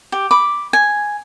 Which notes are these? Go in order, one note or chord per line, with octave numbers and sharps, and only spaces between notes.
G4
B5 D6
G#5